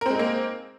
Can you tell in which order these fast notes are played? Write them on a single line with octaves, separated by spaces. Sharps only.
A#4 C4 G#3 D#4 A#3